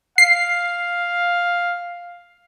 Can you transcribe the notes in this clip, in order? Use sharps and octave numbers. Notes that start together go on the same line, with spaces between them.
F5 C7